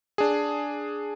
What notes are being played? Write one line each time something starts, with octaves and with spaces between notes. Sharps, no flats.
D4 G#4